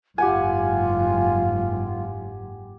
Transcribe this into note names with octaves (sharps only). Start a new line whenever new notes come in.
F#1 G#2 F4 G4 F#5 G#5